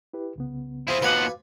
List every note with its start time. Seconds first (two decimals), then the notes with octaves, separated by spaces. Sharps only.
0.14 E4 G4 B4
0.36 C2 C#3 B3
0.88 F3 C4 E4 G#4
1.02 D#2 F3 F#4 B4 F5 F#5 G#5 D6